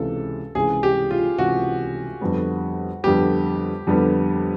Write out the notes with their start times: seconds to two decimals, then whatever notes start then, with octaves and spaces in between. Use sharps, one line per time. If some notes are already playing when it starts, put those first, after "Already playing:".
Already playing: C#2 C3 E3 A4
0.55 C#2 C3 E3 G#4
0.83 G4
1.11 F4
1.38 C#2 C3 E3 F#4
2.21 F2 D3 G3 B3
3.03 F2 D3 G3 B3 G4
3.87 F2 D3 G3 B3